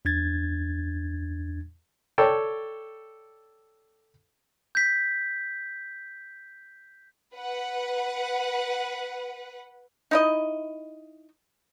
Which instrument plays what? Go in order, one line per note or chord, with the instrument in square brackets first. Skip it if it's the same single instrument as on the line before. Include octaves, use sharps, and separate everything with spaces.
[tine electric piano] E2 D4 G#6 A6
[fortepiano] A4 C#5 D5 G5
[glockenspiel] G6 B6
[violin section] B4 F#5
[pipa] D#4 E4 D#5